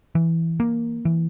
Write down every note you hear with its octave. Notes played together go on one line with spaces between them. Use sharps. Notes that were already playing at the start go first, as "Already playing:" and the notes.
E3
A#3
E3